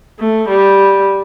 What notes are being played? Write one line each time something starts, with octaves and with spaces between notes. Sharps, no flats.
A3
G3